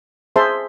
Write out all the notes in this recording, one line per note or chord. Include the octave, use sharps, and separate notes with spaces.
G#4 C5 E5 A5 C6